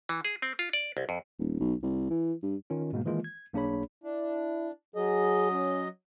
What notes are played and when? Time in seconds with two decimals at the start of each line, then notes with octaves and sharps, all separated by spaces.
0.09 E3
0.25 G#4
0.42 C4
0.59 F4
0.73 D5
0.97 C2
1.09 F2
1.39 D#1
1.60 B1
1.83 C2
2.10 E3
2.42 G2
2.70 D#3 C#4 F4
2.92 G#2 B2 G#3 A#3
3.05 D#3 E3 G#3 A#3 F4
3.24 G#6
3.53 B1 A#3 D4 G#4 C#5 B5
4.04 D4 E4
4.96 F#3 G#4 D#5
5.52 C#4